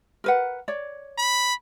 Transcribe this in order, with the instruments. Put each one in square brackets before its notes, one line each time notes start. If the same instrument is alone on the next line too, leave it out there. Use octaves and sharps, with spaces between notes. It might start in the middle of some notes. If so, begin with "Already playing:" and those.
[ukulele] A#4 B4 F#5
C#5 D5
[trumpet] B5